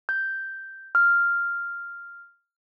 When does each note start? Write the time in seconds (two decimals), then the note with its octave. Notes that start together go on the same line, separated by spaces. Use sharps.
0.09 G6
0.95 F6